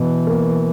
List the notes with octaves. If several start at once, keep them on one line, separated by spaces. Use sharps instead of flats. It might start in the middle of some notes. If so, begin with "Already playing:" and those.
Already playing: B2 E3
A#3